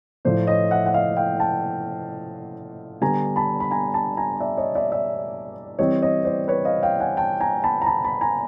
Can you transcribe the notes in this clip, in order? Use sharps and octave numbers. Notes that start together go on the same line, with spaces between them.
A2 F3 A3 C5 D5
C#5 D#5
E5 F#5
F#5
D#5 F5
F5 G5
G5 A5
D3 G3 B3 D4 G#5 A#5
A5 B5
B5
G#5 A#5
A5 B5
G#5 A#5
D5 E5
C#5 D#5
D5 E5
D5 E5
E3 G3 C4 C#5 D#5
C#5 D#5
C5 D5
B4 C#5
D#5 F5
F5 G5
F#5 G#5
G5 A5
G#5 A#5
A5 B5
A#5
A5 B5
A5 B5
G#5 A#5